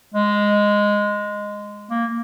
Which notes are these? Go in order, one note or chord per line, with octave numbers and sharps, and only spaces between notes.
G#3
A#3